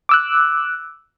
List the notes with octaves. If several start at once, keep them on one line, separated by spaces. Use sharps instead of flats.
D6 E6 F#6